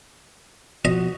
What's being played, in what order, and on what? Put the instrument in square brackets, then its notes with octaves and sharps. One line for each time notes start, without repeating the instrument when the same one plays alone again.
[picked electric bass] F3 [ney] F#4 [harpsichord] D#5